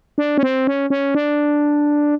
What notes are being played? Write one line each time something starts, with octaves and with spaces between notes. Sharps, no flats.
D4
C#4
C4
C#4
C#4
D4